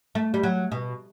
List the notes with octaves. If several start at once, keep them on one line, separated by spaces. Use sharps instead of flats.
A3
G3
F#3
B2